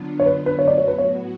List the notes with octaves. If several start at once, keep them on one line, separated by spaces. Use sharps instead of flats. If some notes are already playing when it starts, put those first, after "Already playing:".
Already playing: D3 F#3 B3 D4 F4
C#5
B4
B4
C#5
A2 F#3 B3 F#4 D5
C#5
B4
C#5